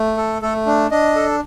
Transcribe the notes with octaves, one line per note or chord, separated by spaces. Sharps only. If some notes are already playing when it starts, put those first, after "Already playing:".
Already playing: A3
A4
A3 A4
D4
D4 D#5
A4